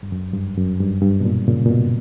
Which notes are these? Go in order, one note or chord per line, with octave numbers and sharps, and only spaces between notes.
G2
F#2
G2
F#2
G2
G2
B2
A#2
A#2 C#3
A#2
B2